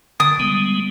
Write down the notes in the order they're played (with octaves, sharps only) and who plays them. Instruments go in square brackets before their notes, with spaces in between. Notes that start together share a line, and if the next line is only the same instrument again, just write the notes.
[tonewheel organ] D3 [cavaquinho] D#6
[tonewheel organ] G3 G#3 B3